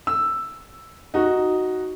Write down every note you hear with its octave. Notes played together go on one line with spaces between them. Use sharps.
E6
D#4 F#4